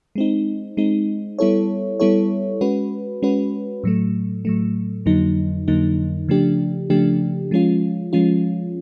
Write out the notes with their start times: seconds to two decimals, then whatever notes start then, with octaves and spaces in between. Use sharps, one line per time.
0.15 G#3 C4 D#4
0.77 G#3 C4 D#4
1.39 G3 B3 E4 A4 C#5
2.00 G3 B3 E4 A4 C#5
2.61 G#3 C#4 F#4 B4
3.22 G#3 C#4 F#4 B4
3.84 A2 F#3 A3
4.45 A2 F#3 A3
5.06 F2 D3 F#3 A#3 D#4
5.68 F2 D3 F#3 A#3 D#4
6.28 C#3 F3 A3 D4 G4
6.90 C#3 F3 A3 D4 G4
7.51 F3 G#3 C#4 F4
8.13 F3 G#3 C#4 F4